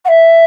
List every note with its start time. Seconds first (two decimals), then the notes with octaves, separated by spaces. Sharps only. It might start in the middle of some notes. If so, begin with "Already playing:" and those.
0.05 F#5
0.08 E5